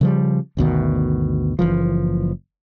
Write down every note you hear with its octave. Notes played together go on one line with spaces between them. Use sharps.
C#3 F3 G3
G1 D2 B2 D#3
F#1 E3 F3